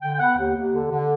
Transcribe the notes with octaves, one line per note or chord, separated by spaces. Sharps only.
D3 G5
G5
B3 F#5
D#2
D#2
D3
D3